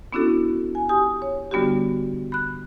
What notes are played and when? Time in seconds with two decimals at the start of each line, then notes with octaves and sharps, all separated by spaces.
0.13 B3 C#4 D4 E4 F#4 A4
0.75 G#5
0.89 G4 G#5 D#6
1.22 C#5
1.51 D3 G3 B3 D4 F#4 G4
2.32 B5 F#6